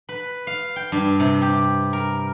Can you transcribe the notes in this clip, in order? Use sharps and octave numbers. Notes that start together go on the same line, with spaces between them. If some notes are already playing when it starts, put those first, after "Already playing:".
B4
F5
G5
G2
C3
G4
A#4